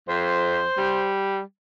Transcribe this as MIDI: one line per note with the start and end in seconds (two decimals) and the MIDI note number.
0.09 0.64 41
0.09 1.08 72
0.78 1.40 55